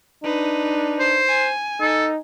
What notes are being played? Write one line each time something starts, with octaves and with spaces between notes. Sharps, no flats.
D4 D#4 B4
C5
G#5
D#4 A4